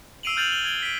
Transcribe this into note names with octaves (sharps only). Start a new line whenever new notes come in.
E6 C7 D7 D#7 F7 F#7
E6 F6 G6 A6 F7 F#7
G7
G#6 D7 G7
B6 D7